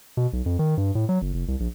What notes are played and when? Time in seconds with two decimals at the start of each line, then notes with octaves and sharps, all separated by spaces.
0.17 B2
0.33 B1
0.46 F2
0.59 D#3
0.77 G2
0.95 A2
1.09 F#3
1.22 F#1
1.34 F1
1.48 C2
1.60 A#1